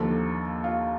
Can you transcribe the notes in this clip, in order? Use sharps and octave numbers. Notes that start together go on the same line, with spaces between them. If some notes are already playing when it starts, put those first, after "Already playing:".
Already playing: D#2 D3 F3 A#3 A4
F4